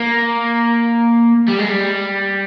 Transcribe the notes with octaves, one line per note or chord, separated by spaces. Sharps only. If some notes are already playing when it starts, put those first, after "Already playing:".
Already playing: A#3
G3
G#3
G3